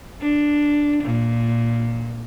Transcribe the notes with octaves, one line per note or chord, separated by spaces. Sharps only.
D4
A#2